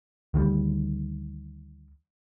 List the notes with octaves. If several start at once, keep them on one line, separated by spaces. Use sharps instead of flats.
D2 D#3 F3 G3